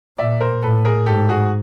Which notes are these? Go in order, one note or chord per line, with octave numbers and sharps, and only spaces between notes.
A#2 D5 E5
A#4 C5
A2 A4 B4
G#4 A#4
G#2 G4 A4
F#4 G#4